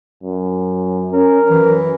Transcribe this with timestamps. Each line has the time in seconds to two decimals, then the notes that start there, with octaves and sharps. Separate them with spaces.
0.23 F#2
1.13 C#4 A#4
1.50 F#2 E3